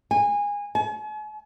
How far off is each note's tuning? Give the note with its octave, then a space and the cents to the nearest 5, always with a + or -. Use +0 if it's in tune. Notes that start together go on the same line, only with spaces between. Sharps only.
G#5 -20
G#5 +45